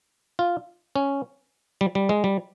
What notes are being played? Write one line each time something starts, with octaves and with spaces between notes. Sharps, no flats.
F4
C#4
G3
G3
G#3
G3